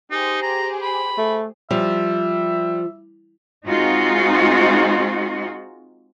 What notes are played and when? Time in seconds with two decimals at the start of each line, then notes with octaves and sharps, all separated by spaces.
0.11 D#4 G4 G#4 C5
0.43 A#5
0.82 B5
1.18 A3
1.71 F3 G3 E5
3.67 G#3 C4 D#4 F4 F#4